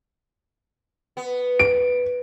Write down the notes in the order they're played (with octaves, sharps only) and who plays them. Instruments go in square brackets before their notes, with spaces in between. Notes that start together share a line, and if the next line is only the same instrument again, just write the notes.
[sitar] B3
[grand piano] D7